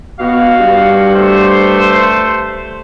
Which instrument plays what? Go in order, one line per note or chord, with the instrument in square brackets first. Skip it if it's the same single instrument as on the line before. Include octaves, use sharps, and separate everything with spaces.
[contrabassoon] B2 [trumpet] F#4 [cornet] F5
[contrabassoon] G2
[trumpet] A3 [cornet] C5